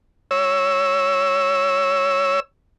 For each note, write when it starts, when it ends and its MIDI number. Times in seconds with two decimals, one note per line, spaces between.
0.31 2.40 73
0.31 2.40 88